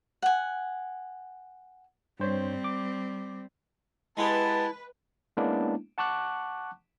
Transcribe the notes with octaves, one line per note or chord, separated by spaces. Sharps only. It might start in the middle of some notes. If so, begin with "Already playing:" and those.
F#5 G#5
G2 G3 C4 C5 C#5
D6
G#3 B3 E4 G4 B4 A5
G#3 A#3 B3 C#4 D4 E4
F#5 A5 C#6 D6 F#6